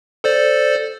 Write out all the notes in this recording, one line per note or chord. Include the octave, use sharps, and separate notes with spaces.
A4 C5 D5